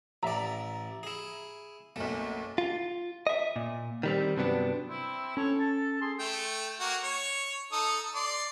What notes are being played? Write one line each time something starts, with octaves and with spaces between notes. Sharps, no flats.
A1 D5 E5 A#5
E4 G#4
F#1 B1 A3
F4
D#5 E5
A#2
D#3 G3 C4
G2 C3 F#3 B3 D4
C4 E4
C#4 A4 C#5
A5
G#4 C6
A3 G5
A#3 F#4
C#5
D#4 A4 D#6
D5 C6